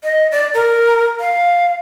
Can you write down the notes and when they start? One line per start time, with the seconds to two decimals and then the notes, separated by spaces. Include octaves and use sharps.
0.04 D#5
0.32 D5
0.54 A#4
1.20 F5